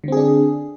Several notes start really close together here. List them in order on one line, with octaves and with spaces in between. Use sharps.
D3 C4 G#4 D4